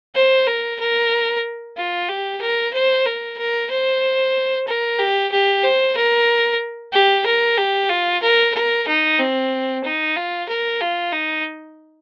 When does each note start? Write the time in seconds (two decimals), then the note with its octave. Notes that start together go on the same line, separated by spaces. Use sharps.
0.15 C5
0.47 A#4
0.79 A#4
1.77 F4
2.09 G4
2.41 A#4
2.74 C5
3.06 A#4
3.38 A#4
3.71 C5
4.67 A#4
4.99 G4
5.31 G4
5.64 C5
5.96 A#4
6.93 G4
7.26 A#4
7.58 G4
7.90 F4
8.22 A#4
8.54 A#4
8.87 D#4
9.19 C4
9.84 D#4
10.17 F4
10.48 A#4
10.81 F4
11.13 D#4